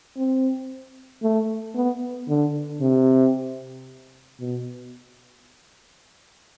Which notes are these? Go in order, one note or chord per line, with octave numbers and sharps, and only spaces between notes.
C4
A3
B3
D3
C3
B2